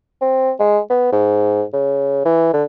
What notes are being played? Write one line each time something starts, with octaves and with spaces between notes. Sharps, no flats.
C4
G#3
B3
G#2
C#3
E3
D3